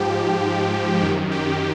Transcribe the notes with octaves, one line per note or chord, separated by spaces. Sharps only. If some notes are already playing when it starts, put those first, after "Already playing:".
Already playing: G#2 F3 G4
F#2 D#3 G4
G4